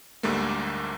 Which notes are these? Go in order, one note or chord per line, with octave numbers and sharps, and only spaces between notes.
D2 G#2 D3 G3 A3 A#3